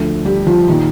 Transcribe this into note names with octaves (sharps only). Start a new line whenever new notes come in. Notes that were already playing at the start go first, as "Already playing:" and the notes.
Already playing: D2 D3 F3 A3
G3 G4
F3 F4
A#2 D#3 F3 D#4